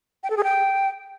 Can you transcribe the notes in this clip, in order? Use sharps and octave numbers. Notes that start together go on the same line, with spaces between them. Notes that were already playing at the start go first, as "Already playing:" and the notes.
G5
A4
G#4
G5